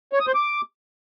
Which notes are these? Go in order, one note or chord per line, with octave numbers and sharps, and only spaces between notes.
C#5
D#6
C5
D6